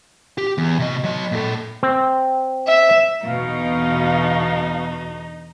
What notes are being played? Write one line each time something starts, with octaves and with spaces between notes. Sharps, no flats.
G4
E2
C3 D#5
F#3 D#5
A#2 A4
C4
E5
E2 B2 D3 D#4 F5